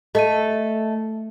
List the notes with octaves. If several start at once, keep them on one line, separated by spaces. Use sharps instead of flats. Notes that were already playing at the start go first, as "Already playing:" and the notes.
A3 D#5 D#7